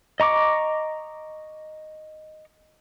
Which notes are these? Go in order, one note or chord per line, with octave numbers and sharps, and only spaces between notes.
D#5 A#5 C#6 D6